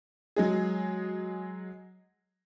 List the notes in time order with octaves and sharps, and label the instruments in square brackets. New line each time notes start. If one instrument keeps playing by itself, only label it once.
[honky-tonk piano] F#3 G#3 G#4